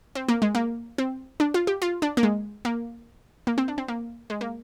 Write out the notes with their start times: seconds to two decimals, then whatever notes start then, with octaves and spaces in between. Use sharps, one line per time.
0.15 C4
0.29 A#3
0.42 G#3
0.55 A#3
0.98 C4
1.40 D4
1.54 F4
1.67 G4
1.82 F4
2.02 D4
2.17 A#3
2.23 G#3
2.65 A#3
3.47 A#3
3.58 C4
3.68 D4
3.78 C4
3.88 A#3
4.30 G#3
4.41 A#3